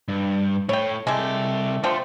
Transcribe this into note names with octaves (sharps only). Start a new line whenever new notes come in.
G2
A2 C#5 G5
C2 G#3 A3 G4
D3 F3 A3 G5